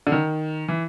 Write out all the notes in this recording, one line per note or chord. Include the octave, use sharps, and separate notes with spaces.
D3
D#3
E3